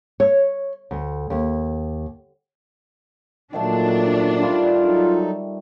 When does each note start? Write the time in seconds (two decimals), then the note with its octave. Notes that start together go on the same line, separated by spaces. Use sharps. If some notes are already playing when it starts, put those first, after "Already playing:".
0.20 C#5
0.91 D2
1.30 D#2
3.53 A#2 D#3 F3 F#3 A3 D4
4.42 G3 F4
4.83 F#3 D#4 A4